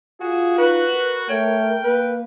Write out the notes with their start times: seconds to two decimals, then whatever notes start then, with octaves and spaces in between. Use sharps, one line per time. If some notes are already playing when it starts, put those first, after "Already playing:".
0.21 F4 F#4 G#4
0.58 D#4 F#4 B4
0.94 A#4
1.29 A3 C#5 G5
1.84 A#3 B4